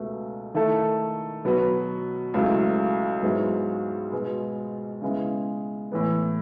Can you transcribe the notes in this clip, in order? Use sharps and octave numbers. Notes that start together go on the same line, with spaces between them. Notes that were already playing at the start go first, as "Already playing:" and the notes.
Already playing: C#2 B2 A3
D#3 A3 E4 A4
B2 F#3 B3 F#4 B4
C#2 C#3 F#3 A3 E4
G#2 F#3 B3 E4 G#4
B2 G#3 B3
C#3 G#3 B3 E4
A2 E3 B3